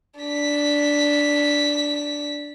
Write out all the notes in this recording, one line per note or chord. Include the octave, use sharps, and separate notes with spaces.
D4 B6